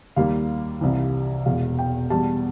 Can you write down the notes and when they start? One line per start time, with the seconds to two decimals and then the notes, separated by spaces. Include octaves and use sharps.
0.16 D#2 D#3 G3 A#3 F5
0.81 C2 C3 E3
1.46 E1 E2 B2 G#3 F5
1.79 G5
2.10 E2 B2 G3 A5